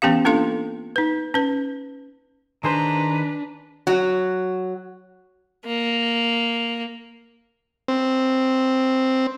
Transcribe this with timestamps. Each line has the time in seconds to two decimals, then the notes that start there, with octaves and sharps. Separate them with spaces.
0.02 E3 B3 C#4 G4 F5
0.25 A#3 D4 F4 A4 F5 C6
0.96 D#4 B4
1.34 C#4 B4
2.64 D#3 D4 G#4 B4 C5 A#5
3.87 F#3 F#4
5.66 A#3
7.88 C4